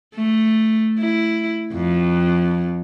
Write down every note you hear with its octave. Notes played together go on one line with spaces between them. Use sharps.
A3
E4
F2